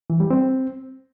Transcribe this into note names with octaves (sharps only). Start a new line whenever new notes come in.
E3
G3
C4